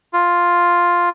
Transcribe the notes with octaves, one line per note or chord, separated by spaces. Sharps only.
F4